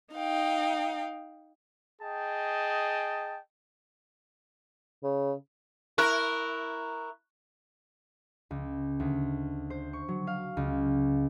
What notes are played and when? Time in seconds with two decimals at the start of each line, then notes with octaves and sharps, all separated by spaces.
0.14 D#4 F5 G5
2.01 G#4 D#5 G5 A5
5.04 C#3
5.98 E4 A#4 C#6 F#6
8.51 C#2
9.00 D2
9.70 C5
9.93 C#6
10.08 F#3
10.27 F5
10.57 C#2